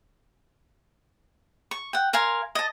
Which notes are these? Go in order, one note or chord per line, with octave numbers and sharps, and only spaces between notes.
C#6
F#5 G5
A#4 F5 G#5 C6
D#5 A5